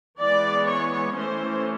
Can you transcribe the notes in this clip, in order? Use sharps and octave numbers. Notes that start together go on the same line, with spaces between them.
E3 G#3 B3 D5
C#5
E3 A3 C#4 C5